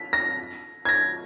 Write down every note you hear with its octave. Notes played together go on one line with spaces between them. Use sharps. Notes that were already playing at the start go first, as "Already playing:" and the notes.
Already playing: B6
A#6
G#6
A#6